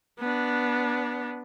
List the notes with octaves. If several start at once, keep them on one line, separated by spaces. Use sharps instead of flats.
B3 D4